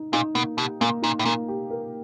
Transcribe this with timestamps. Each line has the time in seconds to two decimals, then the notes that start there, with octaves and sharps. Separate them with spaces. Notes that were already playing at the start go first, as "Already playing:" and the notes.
Already playing: D#4
0.13 A#2 D#4
0.35 B2 A#3
0.58 B2 G4
0.81 A#2 A#3
1.02 A#2 D#4
1.19 A2
1.25 A#2 A#3
1.48 G4
1.70 A#4